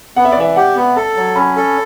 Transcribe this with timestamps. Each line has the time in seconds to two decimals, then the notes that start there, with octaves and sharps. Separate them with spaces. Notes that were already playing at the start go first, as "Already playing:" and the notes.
0.16 B3 F#5
0.25 E5
0.32 D5
0.37 E3 E5
0.56 G4 F#5
0.76 B3
0.96 A4 A5
1.16 F#3
1.36 C#4 B5
1.56 A4